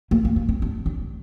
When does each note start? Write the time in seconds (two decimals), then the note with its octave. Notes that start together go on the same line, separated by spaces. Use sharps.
0.11 A#3
0.25 A#3
0.36 A#3
0.49 C4
0.62 D4
0.86 D4